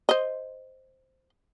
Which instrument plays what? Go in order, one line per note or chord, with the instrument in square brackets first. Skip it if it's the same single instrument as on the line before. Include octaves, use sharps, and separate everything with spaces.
[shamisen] C5 D#5